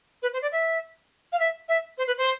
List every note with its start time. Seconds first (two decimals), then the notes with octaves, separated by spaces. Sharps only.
0.22 B4
0.33 C5
0.42 D5
0.52 E5
1.32 F5
1.39 E5
1.68 E5
1.98 C5
2.07 B4
2.17 C5